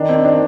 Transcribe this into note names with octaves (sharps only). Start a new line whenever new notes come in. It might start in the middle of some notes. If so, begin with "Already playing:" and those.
Already playing: D#3 D4
C4
D4